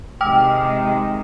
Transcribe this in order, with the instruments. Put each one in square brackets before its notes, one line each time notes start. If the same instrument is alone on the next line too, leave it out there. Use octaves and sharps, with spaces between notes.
[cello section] C3 D#3 G#3 [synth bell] G5 D6 F6